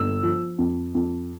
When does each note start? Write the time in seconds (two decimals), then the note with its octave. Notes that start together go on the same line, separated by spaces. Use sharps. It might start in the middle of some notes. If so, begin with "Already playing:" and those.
Already playing: G1 E6
0.23 F3
0.58 F2
0.95 F2